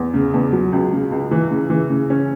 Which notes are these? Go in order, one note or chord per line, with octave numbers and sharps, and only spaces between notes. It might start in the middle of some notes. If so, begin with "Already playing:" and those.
Already playing: E2
C#3
E2
F#3
C#2
C#3
C#2
E3
C#3
E3
C#3
C#4